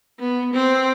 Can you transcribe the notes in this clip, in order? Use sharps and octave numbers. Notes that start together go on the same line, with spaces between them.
B3
C4